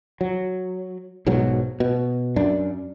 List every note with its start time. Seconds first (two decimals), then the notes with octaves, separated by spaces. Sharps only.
0.21 F#3
1.26 B1 G#2 B2 F#3
1.80 B2
2.36 F#2 D4